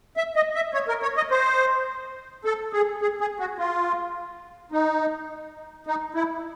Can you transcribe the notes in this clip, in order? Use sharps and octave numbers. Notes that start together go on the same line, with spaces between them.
E5
D#5
E5
C#5
A#4
C#5
D#5
C5
A4
G#4
G#4
G#4
F#4
F4
D#4
D#4
E4